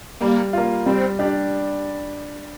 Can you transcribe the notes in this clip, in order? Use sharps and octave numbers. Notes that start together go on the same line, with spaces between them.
G3 A#3
A#3 F4
G3 C4
D4 G4 D5